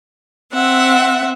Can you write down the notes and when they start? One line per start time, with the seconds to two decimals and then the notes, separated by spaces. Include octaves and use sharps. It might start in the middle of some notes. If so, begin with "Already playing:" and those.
0.52 C4 E5 F#5